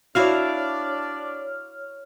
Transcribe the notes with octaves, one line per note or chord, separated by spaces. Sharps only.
D4 E4 F#4 C#5 D5 F5 F6